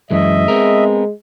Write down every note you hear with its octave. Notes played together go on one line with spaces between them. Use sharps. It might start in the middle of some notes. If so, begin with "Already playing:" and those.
F#2 E3 G#3 D#5 E5
G#3 B3 C4 A#4